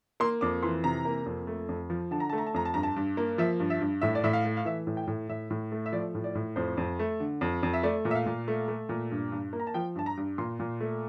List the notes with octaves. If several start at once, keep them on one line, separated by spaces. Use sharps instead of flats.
A#3 C6
F2 D6
E3 C6
C3 A#5
A#3
F2
A3
F2
F3
D3 A5
A#5
A3 A5
A#5
A5
F2 A#5
A5
G2 A#5
A5
G2
A#3
F3 E5
G2
E5
G2
A2 E5
D5
A2 E5
F5
A3
F5
E3 E5
A2
G5
A2
A2 E5
A2
A3
E5
F3 D5
A2
D5
A2
F2 C5
F2
A3
D3
F2
F2
E5
A3 D5
A#2
E5
F5
A#2
A3
A3
A#2
G2
G2
A#3
A#5
A5
F3 G5
G2 A5
A#5
G2
A#2 C6
A#2
A3